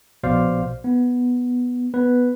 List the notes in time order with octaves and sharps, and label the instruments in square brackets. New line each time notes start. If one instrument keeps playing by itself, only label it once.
[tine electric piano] A#1 B2 C5 D5 F5
B3
B3 B4